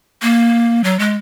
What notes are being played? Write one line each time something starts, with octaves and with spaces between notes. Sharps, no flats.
A#3
F#3
G#3